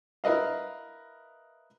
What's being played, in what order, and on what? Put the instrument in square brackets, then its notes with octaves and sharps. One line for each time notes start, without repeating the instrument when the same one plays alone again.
[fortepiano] E4 A#4 B4 D#5 F5